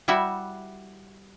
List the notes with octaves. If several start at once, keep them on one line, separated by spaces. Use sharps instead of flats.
G3 E4 F#4 E5